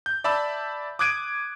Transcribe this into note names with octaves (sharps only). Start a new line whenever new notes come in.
G6
D5 E5 A5 B5 E6
D6 D#6 F#6 G#6 D7 D#7